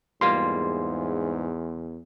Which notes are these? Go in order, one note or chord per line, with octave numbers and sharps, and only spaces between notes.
E2 G#2 G3 A#3 F4 C6